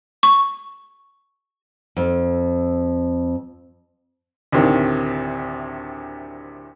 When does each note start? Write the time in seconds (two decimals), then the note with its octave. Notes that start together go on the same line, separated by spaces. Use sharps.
0.23 C#6
1.97 F2
4.52 D2 A2 C3 D#3